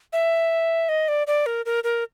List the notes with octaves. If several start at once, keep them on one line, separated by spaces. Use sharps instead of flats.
E5
D#5
D5
D5
A#4
A#4
A#4